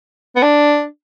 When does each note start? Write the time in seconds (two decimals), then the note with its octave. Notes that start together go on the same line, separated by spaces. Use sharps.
0.36 B3
0.42 D4